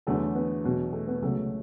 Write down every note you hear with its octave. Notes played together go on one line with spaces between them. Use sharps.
E2 D3 F#3 A3
B3
E2 B2 F#3
A3
B3
C#2 C#3 F#3 A3